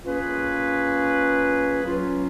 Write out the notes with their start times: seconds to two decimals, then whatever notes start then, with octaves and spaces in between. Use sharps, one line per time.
0.04 A#3 C#4 F4 G#4 B4
1.82 F#3 C#4 F4